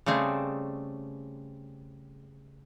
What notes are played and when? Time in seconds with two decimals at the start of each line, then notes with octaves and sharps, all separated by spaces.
0.06 C#3 G3 A3 C4 G#4